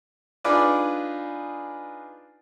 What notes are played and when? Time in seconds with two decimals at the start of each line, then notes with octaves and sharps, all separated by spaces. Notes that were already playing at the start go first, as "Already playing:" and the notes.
0.44 D4 D#4 F4 G#4 B4 D5